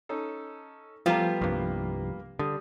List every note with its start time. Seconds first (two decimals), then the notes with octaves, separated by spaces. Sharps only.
0.09 C#4 D#4 A4
1.06 F3 G3 A3 B3 F4 A#5
1.41 C2 G2 A#3
2.39 D3 G3 D#6